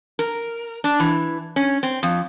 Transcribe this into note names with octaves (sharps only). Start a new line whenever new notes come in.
A#4
D4
E3
C#4
C4
F2